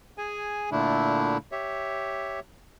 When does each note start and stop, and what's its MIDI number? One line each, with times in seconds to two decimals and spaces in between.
0.18 0.70 68
0.18 0.70 80
0.72 1.37 46
0.72 1.37 50
0.72 1.37 57
0.72 1.37 62
0.72 1.37 64
1.52 2.40 67
1.52 2.40 73
1.52 2.40 76